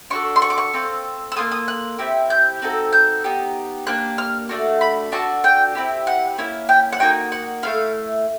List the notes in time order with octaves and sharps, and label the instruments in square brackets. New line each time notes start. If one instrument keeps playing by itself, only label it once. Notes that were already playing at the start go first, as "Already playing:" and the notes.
[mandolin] D4 F#4 A4 C#6
C6
C#6
D6
C#6
C4 F4 A4
E6
A#3 C#4 F4 A4 D#6
D#6
F#6
C4 E4 G4
G6
C4 D#4 F#4 A4
G6
B3 D#4 G4
A#3 D4 G4 F#6
F6
A3 D4 F#4
B5
D4 F#4 A4 A5
G5
C4 E4 G4
F#5
A#3 C#4 E4
G5
F#5
A#3 D#4 F#4 G5
F#5
A3 C#4 E4 F5